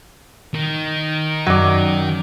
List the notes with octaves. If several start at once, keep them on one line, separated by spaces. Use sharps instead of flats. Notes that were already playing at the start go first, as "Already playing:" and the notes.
D#3
F#2 F#3 D5